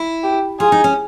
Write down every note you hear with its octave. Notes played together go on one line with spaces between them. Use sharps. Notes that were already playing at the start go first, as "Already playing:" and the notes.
Already playing: E4
G4
F4 G#4
D#4
C#4